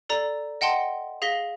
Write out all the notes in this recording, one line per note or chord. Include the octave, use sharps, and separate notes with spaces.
A4 D5 A#5
D#5 F#5 G5 A5 C6
G#4 F5 A#6 B6 G7